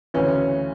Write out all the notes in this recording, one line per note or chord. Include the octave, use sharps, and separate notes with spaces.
D2 C#3 E3 C#4